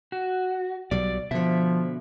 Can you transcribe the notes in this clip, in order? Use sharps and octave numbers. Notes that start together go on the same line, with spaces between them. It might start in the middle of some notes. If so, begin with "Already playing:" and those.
F#4
B1 F#3 G3 D5
B2 D3 F3 E5